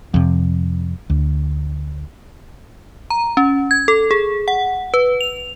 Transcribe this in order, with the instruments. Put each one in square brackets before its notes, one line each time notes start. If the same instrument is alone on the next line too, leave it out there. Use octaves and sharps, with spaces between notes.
[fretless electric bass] F2 C3
D2
[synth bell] A#5
C#4
G#6
A4
G#4
F#5
B4
F7